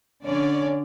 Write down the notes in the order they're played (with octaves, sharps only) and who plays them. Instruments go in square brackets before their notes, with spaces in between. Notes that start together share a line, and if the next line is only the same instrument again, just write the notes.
[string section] D3 C#4 C#5 D5